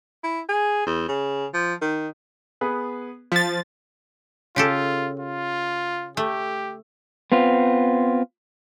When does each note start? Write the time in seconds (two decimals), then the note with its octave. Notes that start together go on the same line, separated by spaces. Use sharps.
0.24 E4
0.49 G#4
0.86 E2
1.08 C#3
1.54 F3
1.82 D#3
2.61 B3 G#4 B4
3.32 F3 A6 B6
4.56 C#3 F4 G4 A4
5.20 F4
6.17 A3 G4
7.32 B3 C4 F4